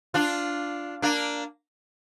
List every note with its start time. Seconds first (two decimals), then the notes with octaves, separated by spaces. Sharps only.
0.14 D4 F4
1.02 A#3 D4